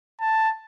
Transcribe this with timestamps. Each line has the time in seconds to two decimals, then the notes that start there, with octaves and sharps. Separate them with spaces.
0.21 A5